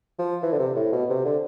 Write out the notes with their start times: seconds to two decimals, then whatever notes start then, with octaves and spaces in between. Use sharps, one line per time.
0.19 F3
0.43 E3
0.53 D3
0.59 C3
0.76 A2
0.93 B2
1.10 C3
1.25 D3